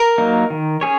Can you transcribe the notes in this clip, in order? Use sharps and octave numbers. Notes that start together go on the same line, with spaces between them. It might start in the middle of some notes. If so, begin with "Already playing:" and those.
Already playing: A#4
F#3 A#3 D#4
D#3
C#4 G#4 C#5